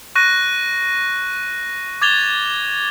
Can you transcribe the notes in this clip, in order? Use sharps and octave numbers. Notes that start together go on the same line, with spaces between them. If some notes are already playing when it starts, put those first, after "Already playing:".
C#6 F#6 A#6 D#7
D6 G#6 A6 F7 G7